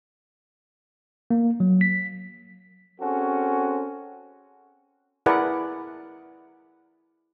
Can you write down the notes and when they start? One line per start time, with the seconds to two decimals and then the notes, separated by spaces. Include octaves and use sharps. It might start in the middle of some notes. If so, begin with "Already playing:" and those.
1.30 A#3
1.60 F#3
1.81 B6
3.00 C4 C#4 F#4 G#4 A4
5.26 E4 G#4 A#4 B4 D5 F#5